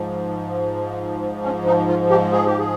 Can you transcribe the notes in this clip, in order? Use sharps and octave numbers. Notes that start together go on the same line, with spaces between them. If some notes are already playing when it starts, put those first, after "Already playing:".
Already playing: G#2 F3
C#4
D#4
F4
G4
G#4
G4
G#4